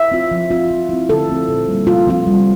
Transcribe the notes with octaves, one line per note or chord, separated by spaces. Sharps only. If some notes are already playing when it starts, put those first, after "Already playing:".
Already playing: E5
C4 F4
F3
C4 F4
F3
C4 E4
D3 A4
F3 C4 F4
A#2
G3 A#3
C3 F4
F3 C4 F4
G3